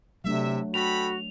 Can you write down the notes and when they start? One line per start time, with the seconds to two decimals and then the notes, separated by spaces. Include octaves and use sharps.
0.24 C3 F#3 A3 D4 E5
0.74 F#4 A4 G5 B5 F7